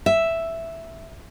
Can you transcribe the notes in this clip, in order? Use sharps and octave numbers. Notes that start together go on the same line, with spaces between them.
E5